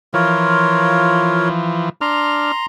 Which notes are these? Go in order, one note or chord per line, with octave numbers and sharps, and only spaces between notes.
E3 F3 F4 A#4 C#5
D4 A#5 C6 F6